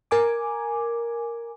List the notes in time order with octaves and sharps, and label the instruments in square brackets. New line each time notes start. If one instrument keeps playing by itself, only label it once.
[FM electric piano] A#4 G#5 D6